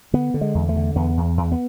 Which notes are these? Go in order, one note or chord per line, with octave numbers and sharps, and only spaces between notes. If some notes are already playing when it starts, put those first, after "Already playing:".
D3 B3
D3
G#3
E2
A3
D3
E2 B3
E2
E2
B3